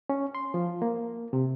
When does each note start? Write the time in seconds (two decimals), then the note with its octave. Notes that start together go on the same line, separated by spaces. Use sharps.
0.10 C#4
0.35 C6
0.54 F3
0.82 A#3
1.33 C3